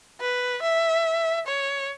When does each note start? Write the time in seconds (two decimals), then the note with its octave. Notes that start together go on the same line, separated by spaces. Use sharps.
0.20 B4
0.62 E5
1.47 C#5